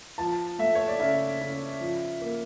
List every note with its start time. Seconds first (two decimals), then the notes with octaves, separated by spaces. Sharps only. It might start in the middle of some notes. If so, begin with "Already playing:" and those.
0.18 F3 A5
0.59 A3 E5
0.75 C#5
0.88 D5
0.99 C#3 E5
1.41 C#3
1.81 F3
2.21 A#3